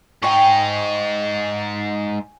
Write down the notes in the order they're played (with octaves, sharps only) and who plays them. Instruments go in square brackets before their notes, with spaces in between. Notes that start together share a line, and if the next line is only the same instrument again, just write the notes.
[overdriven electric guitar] G#2 D#4 [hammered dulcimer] G5 G#5 C#6